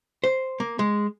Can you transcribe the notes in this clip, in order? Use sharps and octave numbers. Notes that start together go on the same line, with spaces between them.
C5
A#3
G#3